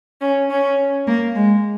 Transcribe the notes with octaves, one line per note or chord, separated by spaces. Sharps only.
C#4
C#4
A#3
G#3